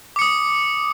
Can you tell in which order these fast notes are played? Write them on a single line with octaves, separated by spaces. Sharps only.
D6 C#7 D#6